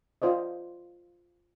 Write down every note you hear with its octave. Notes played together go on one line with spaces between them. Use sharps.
F4 C5 D5 D#5